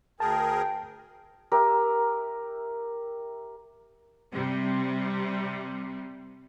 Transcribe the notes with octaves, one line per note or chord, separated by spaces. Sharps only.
D2 G#4 A#4 G5 A5
G4 A#4 E5
C3 G3